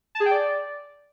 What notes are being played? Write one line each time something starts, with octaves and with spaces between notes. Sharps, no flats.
A5
G#4
G5
D5